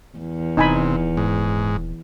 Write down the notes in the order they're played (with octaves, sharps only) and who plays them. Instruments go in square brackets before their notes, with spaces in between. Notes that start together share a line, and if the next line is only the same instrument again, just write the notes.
[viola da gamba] E2
[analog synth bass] D#1 [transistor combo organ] C3 [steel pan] D#4 G#5 B5
[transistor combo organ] G#2